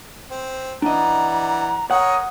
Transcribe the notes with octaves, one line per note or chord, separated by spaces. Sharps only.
C4
E3 D4 D5 D#5 F#5 A#5
A#4 C#5 F#5 D#6